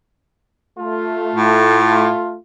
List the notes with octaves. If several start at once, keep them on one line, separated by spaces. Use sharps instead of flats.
A3 F4
A2